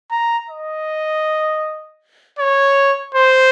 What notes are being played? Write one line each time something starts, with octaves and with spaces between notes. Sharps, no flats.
A#5
D#5
C#5
C5